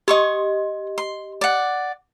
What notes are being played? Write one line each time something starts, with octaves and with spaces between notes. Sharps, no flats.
G4 D#5 C6 C#6 D#6
C6
D5 F#5